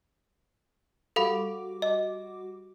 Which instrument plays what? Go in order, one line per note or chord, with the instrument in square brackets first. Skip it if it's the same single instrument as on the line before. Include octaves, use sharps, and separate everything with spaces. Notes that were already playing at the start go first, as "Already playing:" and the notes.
[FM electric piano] G3 F#4 D6 [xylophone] A4 F5 B5
[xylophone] D#5